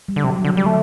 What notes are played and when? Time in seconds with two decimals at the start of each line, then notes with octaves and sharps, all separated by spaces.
0.08 G3
0.16 D3
0.24 C3 F#3
0.40 D3 F#3
0.55 F#3 G3
0.64 D3 A3